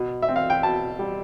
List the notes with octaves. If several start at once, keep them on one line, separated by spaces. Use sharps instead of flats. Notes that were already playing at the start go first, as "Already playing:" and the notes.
Already playing: B2
E5
C4
F5
G5
B2 A5
G3